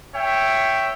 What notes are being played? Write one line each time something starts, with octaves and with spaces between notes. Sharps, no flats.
C#5 E5 G5